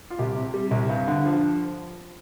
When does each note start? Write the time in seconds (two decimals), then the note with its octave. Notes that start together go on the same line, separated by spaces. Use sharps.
0.10 F4
0.19 C2 G4
0.36 C3
0.54 G3
0.71 C2
0.89 G2
1.08 D3
1.25 F3